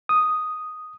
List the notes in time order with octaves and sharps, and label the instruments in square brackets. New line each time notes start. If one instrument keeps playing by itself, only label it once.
[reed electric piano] D#6